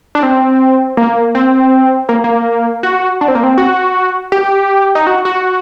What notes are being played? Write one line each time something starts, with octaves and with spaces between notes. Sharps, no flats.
D4
C4
A#3
C4
A#3
A#3
F#4
D4
C4
A#3
C4
F#4
G4
D#4
F#4
F#4